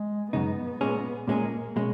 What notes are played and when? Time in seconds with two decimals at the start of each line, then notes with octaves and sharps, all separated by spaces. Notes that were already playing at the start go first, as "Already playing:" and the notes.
Already playing: G#3
0.33 F#2 C#3 G#3 B3 D#4
0.81 A#2 G#3 C#4 G#4
1.28 A#2 G#3 A#3 C#4 G#4
1.76 B2 G#3 C#4